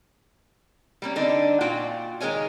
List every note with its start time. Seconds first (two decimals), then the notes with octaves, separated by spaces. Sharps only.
1.02 G3 A#3 C#4
1.16 D3 C4 D4 D#4
1.61 A#2 F4 F#4 G5
2.21 D#3 G#3 A#4 C#5 G#5